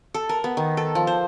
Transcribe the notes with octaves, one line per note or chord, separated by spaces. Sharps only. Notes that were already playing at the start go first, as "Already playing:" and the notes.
A4
A#4
B3
D#3
A4
F3
C5